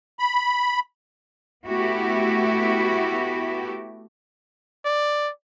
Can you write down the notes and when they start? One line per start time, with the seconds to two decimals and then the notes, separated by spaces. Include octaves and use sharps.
0.19 B5
1.66 A3 B3 E4 F#4 G4
4.85 D5